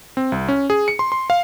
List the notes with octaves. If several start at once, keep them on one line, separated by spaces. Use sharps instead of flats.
C4
C2
C#4
G#4
C#7
C6
C6
F5